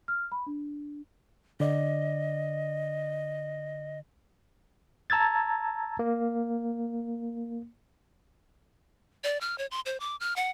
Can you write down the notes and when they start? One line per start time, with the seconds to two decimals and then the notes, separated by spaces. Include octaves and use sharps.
0.08 F6
0.32 B5
0.46 D4
1.60 D3 D5 D#5
5.10 A5 A#5 E6 G#6 A6
5.99 A#3
9.24 D5
9.41 F6
9.58 C#5
9.71 C6
9.86 C5
10.00 D6
10.20 F6
10.36 F#5